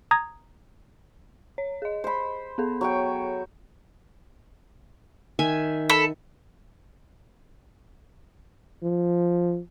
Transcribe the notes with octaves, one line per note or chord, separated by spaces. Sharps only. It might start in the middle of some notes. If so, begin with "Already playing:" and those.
A#5 D#6 G#6
C#5
G#4 D#5
C5 B5
B3 G#4 A4
F#3 C#5 G5
D#3 E5 G#5
A4 B5
F3